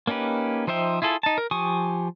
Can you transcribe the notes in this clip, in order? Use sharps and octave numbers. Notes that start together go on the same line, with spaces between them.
A#3 C#4 D#4 G4 B4
F3 D#4 C5 E5 G5
E4 F4 G#4 A4
D#4 A5
A#4
F3 G4 G#5 C#6 D#6